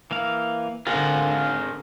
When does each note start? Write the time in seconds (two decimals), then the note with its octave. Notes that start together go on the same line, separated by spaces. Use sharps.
0.11 E3 A#3 F5
0.87 D3 C4 F4 G#4 A#4 F#5